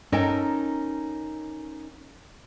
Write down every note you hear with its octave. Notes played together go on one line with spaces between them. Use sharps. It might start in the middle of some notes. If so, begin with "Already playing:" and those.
C#4 D#4 A4 A#4 D#5 G5